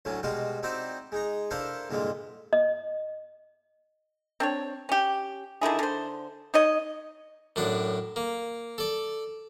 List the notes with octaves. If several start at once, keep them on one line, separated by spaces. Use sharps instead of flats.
D2 A2 D3 F#3 C#4
B2 G3 G#3 F#4 F5 C6
C4 D#4 E4 F#4 C5 D5
G#3 D#4 A#5
D4 E4 A4 A#4 C5 F5
G2 A#2 D3 E3 G#3 F4
D#5
C4 D4 C#5
C#4 G4
D3 D#3 E4 G#4
D3 C5
D#4 C#5 D#5
F#2 A2 D4 F#5
A#3
A4 D5